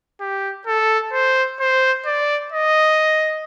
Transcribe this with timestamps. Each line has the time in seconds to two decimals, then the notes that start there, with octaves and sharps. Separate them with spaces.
0.20 G4
0.67 A4
1.13 C5
1.60 C5
2.06 D5
2.52 D#5